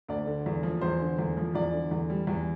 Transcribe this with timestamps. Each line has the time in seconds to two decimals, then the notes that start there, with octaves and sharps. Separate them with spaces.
0.09 D2 D5
0.27 D3
0.46 E2
0.63 F3
0.81 E2 C5
1.00 D3
1.19 E2
1.37 F3
1.55 E2 D5
1.73 D3
1.91 E2
2.10 G3
2.27 E2